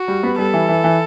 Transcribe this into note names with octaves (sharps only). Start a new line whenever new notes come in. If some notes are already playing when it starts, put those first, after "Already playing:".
Already playing: F#4
G3
B3
G3 A4
E3
E3
E3